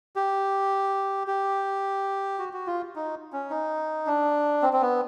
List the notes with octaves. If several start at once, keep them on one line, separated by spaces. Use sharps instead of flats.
G4
G4
F#4
F#4
F4
D#4
C#4
D#4
D4
C4
C4
B3